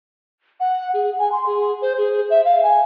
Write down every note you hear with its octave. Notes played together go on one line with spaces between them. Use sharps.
F#5
G#4
G#5
C6
G#4
C5
G#4
E5
F5
G#5